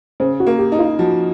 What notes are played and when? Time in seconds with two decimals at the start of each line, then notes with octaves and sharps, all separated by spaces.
0.20 C#3 C5
0.40 F#4
0.47 A#3
0.59 G4
0.72 D#4
0.79 F4
0.99 F3 F#4